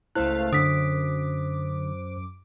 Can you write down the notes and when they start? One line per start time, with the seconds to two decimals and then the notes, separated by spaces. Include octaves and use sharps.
0.15 C#2 A3 E4 C5 F5 F#6
0.53 F#2 D3 D6 D#6 B6